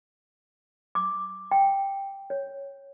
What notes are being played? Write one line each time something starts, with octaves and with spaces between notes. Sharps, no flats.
D6
G5
C#5